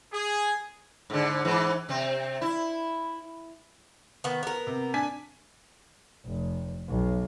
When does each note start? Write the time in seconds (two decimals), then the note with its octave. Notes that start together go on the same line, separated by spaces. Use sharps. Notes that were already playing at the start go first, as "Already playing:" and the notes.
0.12 G#4
1.10 G#2 D3
1.45 G#2 E3
1.89 C3 C4
2.41 E4
4.24 D#3 B3
4.43 B3 A#4
4.67 C3
4.94 D4 G#5 B6
6.26 F1
6.89 B1